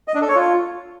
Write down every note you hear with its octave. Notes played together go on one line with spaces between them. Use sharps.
D#5
D4
A4
C#5
F4